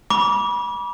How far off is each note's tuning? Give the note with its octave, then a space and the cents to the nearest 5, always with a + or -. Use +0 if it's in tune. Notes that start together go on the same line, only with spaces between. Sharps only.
B5 -35 D6 -25